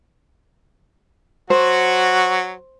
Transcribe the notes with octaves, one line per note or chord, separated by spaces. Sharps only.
F#3 F#4 C5